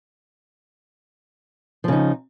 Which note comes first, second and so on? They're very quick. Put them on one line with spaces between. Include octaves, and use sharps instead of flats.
F3 C#3 D#4